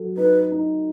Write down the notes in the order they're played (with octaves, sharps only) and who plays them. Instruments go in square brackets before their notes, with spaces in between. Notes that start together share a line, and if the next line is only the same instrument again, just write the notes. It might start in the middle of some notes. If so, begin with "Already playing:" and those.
Already playing: [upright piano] F#3 A4
[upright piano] D#4 [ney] B4
[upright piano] D#4